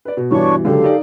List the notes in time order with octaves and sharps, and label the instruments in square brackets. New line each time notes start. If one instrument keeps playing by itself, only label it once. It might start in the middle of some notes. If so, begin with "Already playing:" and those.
[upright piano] B4 D5
B2
[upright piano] G2 B2 E3 [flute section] D4 C#5 C#6
[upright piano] C#2 D3 F#3 [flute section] G4 A4 F5
[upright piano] D#4 A#4 D5